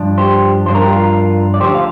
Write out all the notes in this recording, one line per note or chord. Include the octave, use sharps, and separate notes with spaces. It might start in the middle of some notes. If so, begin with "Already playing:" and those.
Already playing: G2 F3 D4
G4 C5
G2 F3 D4 C5
A#4
G4
F4 A#4
D5
D2 D3 F3 G4 C5
F5